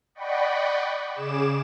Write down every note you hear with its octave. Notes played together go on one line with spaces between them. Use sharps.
D5 D#5 F#5 G5 B5 C#6
C#3 G#4 D6 E7